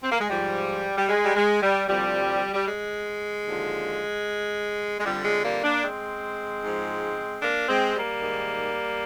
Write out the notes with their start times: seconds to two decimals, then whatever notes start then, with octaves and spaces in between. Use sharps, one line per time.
0.03 C4
0.12 A#3
0.21 G#3
0.30 G#2 F3 G3
0.97 G3
1.09 G#3
1.25 G3
1.36 G#3
1.62 G3
1.88 D2 C3 F3 G3
2.54 G3
2.67 G#3
3.46 D#2 D3 F3
5.00 G#3
5.05 F2 D3 F3 G3
5.24 G#3
5.44 G3 A#3
5.64 A#3 D4
5.84 G#3 C4
6.64 G#2 F3
7.42 A#3 D4
7.69 G#3 C4
7.95 G3 A#3
8.22 G#2 D#3